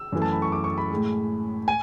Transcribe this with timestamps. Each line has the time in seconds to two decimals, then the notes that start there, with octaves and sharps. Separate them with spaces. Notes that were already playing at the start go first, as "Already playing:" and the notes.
Already playing: E6
0.12 F#2 E3 A3
0.22 A5
0.32 B5
0.42 C#6
0.52 D6
0.64 C#6
0.78 B5
0.90 A2 G#3
1.68 G#5